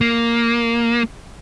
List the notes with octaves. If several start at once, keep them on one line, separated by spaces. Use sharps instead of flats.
A#3